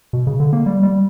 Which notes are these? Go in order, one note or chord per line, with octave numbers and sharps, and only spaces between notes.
B2
C#3
D3
A#3
G3
G3